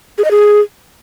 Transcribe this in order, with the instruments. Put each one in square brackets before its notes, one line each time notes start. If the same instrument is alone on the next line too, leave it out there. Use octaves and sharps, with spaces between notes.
[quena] G#4
D#5
G#4